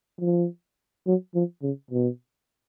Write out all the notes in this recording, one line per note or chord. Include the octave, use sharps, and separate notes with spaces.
F3
F#3
F3
C#3
B2